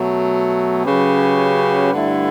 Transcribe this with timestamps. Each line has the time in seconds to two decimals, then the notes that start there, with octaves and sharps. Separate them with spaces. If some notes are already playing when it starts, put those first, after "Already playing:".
Already playing: B2 F#3 A3
0.85 C#3 F#3 C#4 G4 B4
1.93 G2 D3 A3 E4